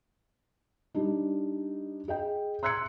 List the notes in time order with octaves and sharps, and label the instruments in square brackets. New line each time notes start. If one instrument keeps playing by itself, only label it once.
[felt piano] G3 D4 D#4
G#4 D#5 G5
C6 E6 F#6 G#6 C#7